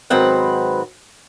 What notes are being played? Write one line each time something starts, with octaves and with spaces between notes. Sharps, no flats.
G#2 D#3 F#3 C4 B4 F#5